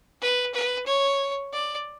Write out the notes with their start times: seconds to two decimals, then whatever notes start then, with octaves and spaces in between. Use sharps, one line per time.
0.21 B4
0.54 B4
0.86 C#5
1.53 D5